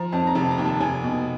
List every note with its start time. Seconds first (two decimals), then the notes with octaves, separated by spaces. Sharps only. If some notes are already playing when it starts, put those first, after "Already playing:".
Already playing: F3 A#5
0.12 F2 A5
0.27 A#5
0.35 F1 A5
0.51 A#5
0.58 D#2
0.65 A5
0.80 F1 G#5
1.03 B2